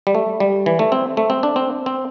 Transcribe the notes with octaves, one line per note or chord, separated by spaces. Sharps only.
G3
A3
G3
E3
A3
C4
A3
C4
D4
C4
C4